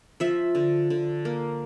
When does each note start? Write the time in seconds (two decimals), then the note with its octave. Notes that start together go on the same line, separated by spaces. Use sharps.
0.20 F3 E5
0.55 D3
0.90 D3
1.25 A#3